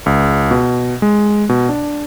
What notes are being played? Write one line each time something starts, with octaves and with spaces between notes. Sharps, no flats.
C#2
B2
G#3
B2
D4